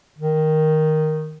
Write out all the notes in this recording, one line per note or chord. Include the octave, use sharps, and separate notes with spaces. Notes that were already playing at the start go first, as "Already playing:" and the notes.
D#3